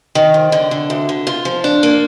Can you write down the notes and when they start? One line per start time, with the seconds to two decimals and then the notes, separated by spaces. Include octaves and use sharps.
0.15 D#3
0.34 F2
0.52 D3
0.71 D3
0.90 D2
1.09 D3
1.27 F4
1.45 F3
1.64 D4
1.83 A#3